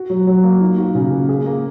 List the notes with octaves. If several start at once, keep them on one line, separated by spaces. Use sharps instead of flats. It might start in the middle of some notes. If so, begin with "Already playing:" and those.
Already playing: F#4
F#3
F#3
A#3
D#4
F#4
C#3
A#3
G#4
A#3